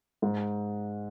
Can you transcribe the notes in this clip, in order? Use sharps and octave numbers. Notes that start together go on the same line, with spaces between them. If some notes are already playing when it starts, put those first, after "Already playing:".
G#2